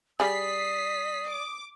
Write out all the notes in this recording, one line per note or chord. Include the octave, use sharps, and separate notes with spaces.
G3 G#4 D5 D#6 B6 C7
D6